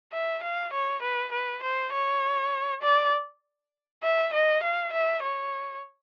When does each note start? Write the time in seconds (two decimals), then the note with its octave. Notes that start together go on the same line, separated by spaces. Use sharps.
0.12 E5
0.43 F5
0.73 C#5
1.02 B4
1.32 B4
1.63 C5
1.92 C#5
2.82 D5
4.03 E5
4.33 D#5
4.63 F5
4.92 E5
5.23 C#5